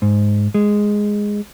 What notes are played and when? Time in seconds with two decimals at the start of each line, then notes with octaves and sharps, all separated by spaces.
0.02 G#2
0.54 G#3